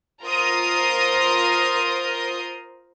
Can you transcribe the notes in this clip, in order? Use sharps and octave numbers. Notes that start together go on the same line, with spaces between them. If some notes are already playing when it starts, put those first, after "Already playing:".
F4 A#4 C5 A#5 C6 D#6